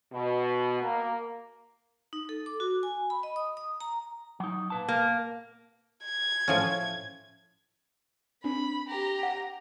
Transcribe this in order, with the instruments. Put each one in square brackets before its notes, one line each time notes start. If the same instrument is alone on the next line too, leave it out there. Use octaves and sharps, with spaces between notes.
[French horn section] B2
A#3
[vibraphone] D#4
A4
D6
F#4
G#5
B5
D#5
D#6
D#6
A#5
[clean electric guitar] F#3 D#4
A#2 B4 A5
[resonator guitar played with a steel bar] A#3
[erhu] G#6
[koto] A2 F3 C#4
[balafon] C4 D4 [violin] B5
[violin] G4 A#5
[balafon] F#5